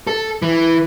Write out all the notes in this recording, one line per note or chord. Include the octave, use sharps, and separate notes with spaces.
A4
E3